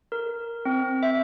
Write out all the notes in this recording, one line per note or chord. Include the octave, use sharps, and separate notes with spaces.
A#4
C4
E5